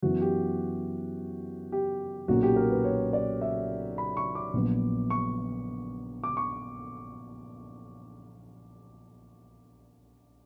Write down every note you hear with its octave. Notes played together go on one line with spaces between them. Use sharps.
F#2 E3 B3 F#4
G4
G4
B1 A#2 A#3 C#4 F#4
G4
A#4
B4
C#5
D5
E5
B5
C#6
D6
A#1 A#2 F#3 B3
C#6
D6
C#6